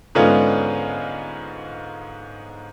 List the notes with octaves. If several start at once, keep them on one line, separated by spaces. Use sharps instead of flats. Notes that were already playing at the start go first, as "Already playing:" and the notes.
G#2 D3 G#3 B3 C#4 F4